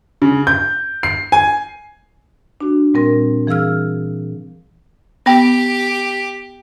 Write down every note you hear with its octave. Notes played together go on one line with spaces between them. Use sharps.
C#3
G6
C7
G#5
D4 F#4
A#2 G3 C4 A#4
E3 G#4 F5 E6 F6
B3 G4 G5